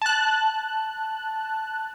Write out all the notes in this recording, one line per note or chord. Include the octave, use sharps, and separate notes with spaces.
A5 F#6